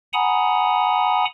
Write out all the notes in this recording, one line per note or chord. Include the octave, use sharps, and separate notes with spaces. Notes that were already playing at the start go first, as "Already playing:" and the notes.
F#5 G#5 A#5 B5 D#6